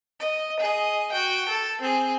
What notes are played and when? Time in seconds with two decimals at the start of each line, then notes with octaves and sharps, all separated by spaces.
0.20 D#5
0.60 G#4 D#5
1.12 F#4 G5
1.49 A4
1.82 C4 G#4